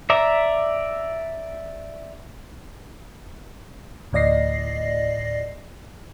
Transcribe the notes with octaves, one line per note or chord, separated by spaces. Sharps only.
D5 E5 A#5
D2 A2 D5 D#5 A#6 C7